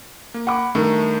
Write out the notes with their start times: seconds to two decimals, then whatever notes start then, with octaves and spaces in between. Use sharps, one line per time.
0.34 A#3
0.47 F#5 B5 D6
0.75 G2 D#3 A3 A#4